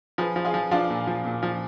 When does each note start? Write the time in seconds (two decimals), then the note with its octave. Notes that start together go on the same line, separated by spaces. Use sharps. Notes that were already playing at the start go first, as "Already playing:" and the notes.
0.18 F3 G#4 B4
0.36 F3
0.45 F4 G#4
0.54 F3
0.71 F3 D4 F4
0.90 A#2
1.07 F3
1.25 A#2
1.43 F3